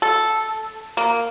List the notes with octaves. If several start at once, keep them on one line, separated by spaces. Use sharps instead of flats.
A4
A#3